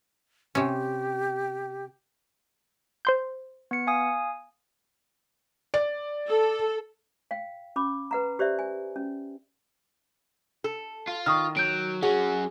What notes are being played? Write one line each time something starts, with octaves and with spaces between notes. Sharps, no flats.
C3 C#4 G4
C5 C6 G6
B3 C#7
F5 G#5 D#6
D5
A4
F5 G5
C#4 B5 D6
B4 F#5 A#5
G4 C5 D5 E5
G#5
C#4
A4
F4
D#3 C#6 D#6 F6
F#3 G6 D7
F#3 C#4 F#4 G#4